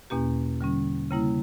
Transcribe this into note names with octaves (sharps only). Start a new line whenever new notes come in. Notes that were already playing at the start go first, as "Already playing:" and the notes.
E2 B2 A#3 C#4 G4
D3 G3 C#4
C#3 G3 A#3 E4